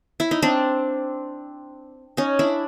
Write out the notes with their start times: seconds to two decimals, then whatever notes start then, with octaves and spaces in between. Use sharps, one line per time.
0.20 E4
0.31 D#4
0.42 C4 D4
2.17 C#4 D#4
2.39 D4 E4